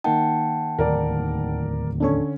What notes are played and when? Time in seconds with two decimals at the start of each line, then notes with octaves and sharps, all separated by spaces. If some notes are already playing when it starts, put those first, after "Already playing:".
0.04 D#3 A#3 D#4 F#5 G5 A5
0.79 D1 D#2 A#4 D5
2.00 D3 C#4 D4 A4 C#5